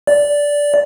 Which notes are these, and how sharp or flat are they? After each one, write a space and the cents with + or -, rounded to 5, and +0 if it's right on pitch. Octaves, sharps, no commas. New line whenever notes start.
D5 -10